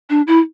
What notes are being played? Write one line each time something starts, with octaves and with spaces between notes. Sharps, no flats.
D4
E4